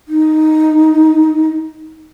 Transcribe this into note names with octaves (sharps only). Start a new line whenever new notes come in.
D#4